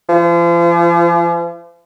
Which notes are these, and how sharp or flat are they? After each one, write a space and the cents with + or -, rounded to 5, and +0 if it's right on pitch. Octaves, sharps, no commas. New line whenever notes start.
F3 -40